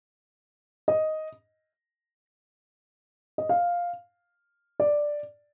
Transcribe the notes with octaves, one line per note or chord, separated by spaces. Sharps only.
D#5
D#5
F5
D5